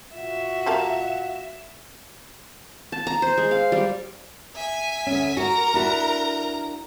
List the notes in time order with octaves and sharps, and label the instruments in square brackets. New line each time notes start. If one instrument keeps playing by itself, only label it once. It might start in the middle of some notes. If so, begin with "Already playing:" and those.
[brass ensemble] A#2 F4 F#4 [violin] E5
[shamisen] G3 A4 A#4
[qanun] A5
A#5
C5
G#3
F5
G3
[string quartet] E5 G#5
[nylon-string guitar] D2 C#4
[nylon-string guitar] F#4 [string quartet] A#4 A#5
[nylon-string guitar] D4 E4 F#4